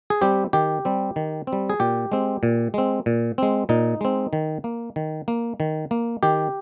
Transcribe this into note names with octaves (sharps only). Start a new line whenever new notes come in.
G#4
G3 C4 G4
D#3 G4
G3 C4
D#3
C4
G3
G#4
A#2 G4
G#3 C4
A#2
G#3 C4
A#2
G#3 C4
A#2 D#4
G#3 C4
D#3
A#3
D#3
A#3
D#3
A#3
D#3 G4